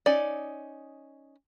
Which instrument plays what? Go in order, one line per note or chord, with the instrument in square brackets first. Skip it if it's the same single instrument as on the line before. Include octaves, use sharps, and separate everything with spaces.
[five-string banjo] C#4 D#4 D5